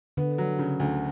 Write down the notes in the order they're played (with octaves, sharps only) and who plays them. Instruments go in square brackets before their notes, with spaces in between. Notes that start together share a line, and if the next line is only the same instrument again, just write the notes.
[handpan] D3 [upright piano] B3
[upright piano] F#3
C#3
D2